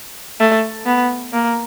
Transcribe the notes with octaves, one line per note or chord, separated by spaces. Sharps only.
A3
B3
A#3